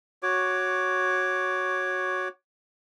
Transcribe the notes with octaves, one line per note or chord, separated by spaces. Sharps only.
F#4 C#5 D6